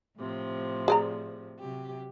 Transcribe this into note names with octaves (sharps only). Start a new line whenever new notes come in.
A2 C3 F3
G#4 D5 A#5
C3 F#3 G4